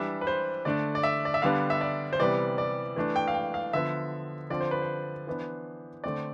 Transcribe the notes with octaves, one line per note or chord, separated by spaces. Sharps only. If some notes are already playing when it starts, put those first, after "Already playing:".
Already playing: E3 G3 D4 E5
B4
C5
D3 A3 D4 D5
D5
E5
D5
E5
D3 G3 B3 D4 F5
E5
D5
C5
C3 E3 G3 B3 D5
D5
E3 A3 D4
G5
F5
G5
F5
D3 F3 B3 E5
D3 F3 C4 D5
C5
B4
C5
E3 B3 D4
D3 A3 C4 D5